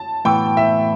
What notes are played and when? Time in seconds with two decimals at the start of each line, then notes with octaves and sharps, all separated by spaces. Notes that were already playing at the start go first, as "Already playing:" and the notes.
Already playing: A5
0.25 A2 E3 B3 G5
0.57 E5